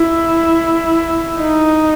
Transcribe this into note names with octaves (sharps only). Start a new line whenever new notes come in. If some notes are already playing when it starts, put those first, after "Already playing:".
Already playing: E4
D#4